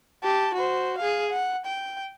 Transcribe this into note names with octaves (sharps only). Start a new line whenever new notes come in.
G4 A5
F#4 C5
G#4 F5
F#5
G5